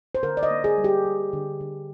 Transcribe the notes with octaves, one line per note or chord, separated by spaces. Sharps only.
C5
D3 A#4
D5
D#5
A#3
G#4
G3
G4
G3
D3
D3